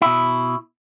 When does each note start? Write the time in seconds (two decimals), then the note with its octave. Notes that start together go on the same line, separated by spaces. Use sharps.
0.02 B2 E4